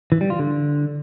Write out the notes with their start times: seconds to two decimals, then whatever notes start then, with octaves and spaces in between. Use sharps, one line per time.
0.12 E3
0.21 G3
0.30 F4
0.39 D3